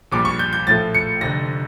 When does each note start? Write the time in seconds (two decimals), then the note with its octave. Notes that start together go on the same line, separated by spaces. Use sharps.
0.12 A#1 A#2 G3 D6
0.25 C#6
0.39 G6
0.53 G6
0.67 A#1 A2 F3 A3 A6
0.95 C#7
1.21 F1 F2 D3 A#6